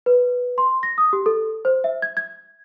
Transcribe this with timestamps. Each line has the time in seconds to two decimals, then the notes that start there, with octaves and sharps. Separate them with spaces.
0.06 B4
0.58 C6
0.83 A#6
0.98 D#6
1.13 G4
1.26 A4
1.65 C5
1.84 E5
2.02 G#6
2.17 G#6